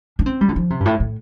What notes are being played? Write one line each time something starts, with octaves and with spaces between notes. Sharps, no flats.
D4
C4
G3
D3
F3
C3
G2
A2
A2